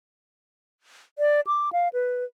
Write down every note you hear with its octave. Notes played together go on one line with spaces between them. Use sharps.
D5
D6
F5
B4